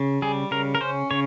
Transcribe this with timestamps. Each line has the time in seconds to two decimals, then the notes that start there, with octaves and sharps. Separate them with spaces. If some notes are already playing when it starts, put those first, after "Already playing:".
Already playing: C#3
0.22 G3 G#4
0.51 C#3 A#4
0.75 A#4
0.81 C#4 C5
1.11 C#3 C#5